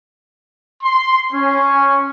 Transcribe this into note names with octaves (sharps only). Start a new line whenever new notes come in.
C6
C#4